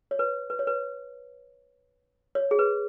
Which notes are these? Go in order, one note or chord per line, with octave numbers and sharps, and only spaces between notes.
C#5
B4
B4
C#5
B4
C#5
G#4
B4